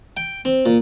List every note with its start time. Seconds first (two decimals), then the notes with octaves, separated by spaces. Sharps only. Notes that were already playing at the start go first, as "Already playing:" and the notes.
0.17 G5
0.45 C4
0.66 A#2